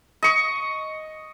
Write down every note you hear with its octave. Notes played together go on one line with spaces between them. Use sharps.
D#5 C#6